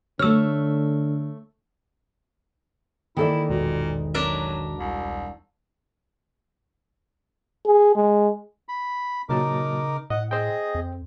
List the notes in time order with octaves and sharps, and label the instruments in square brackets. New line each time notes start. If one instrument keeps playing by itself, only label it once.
[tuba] D3 [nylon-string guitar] A3 C#5 [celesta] E6 F6
[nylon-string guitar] D#3 A4 D5 [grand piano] E3 A#3 [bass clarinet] E4
[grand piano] E1 B1 [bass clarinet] A#2
[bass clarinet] F#3 [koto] D4 A#4 E5
[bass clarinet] C2
[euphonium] G#4
G#3
[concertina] B5
[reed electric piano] A#2 F#3 A5 [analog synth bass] C#3 [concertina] D#4 A#4 D6
[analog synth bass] A2 [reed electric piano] D#5 [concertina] F#5
[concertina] G#4 D#5 [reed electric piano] C5 G5
[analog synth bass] F2